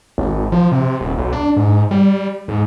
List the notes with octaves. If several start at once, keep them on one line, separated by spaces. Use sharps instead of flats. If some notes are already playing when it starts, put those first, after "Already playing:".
G#1
F3
C3
D#1
B1
D4
G#2
G3
G#2